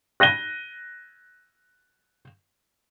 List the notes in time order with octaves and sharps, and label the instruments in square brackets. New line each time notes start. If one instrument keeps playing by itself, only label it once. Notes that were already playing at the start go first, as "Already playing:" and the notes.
[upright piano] F#6 A#6 D#7 G7